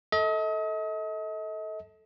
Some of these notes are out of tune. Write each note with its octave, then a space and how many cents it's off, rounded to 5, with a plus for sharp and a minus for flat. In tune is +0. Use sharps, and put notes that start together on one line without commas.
A4 +0 D#5 +40